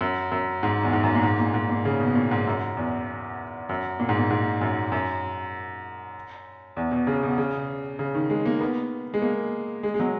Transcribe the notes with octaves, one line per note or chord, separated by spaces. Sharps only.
F#2
F#2
G#2
E2
G#2
F#2
A#2
G#2
A#2
G#2
A#2
C#3
B2
A#2
G#2
F#2
E2
F#2
A#2
G#2
A#2
G#2
F#2
F#2
E2
B2
C#3
B2
C#3
C#3
D#3
G#3
A#3
B3
G#3
A#3
G#3
G#3
F#3